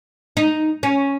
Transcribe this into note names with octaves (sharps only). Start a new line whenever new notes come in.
D#4
C#4